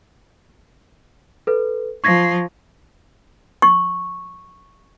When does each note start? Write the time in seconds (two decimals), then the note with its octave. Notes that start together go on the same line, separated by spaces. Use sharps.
1.47 A4 B4
2.04 F3 C#6 G#6 A#6
3.62 C#6